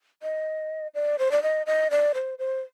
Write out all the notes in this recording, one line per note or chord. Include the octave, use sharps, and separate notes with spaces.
D#5
D5
C5
D5
D#5
D#5
D5
C5
C5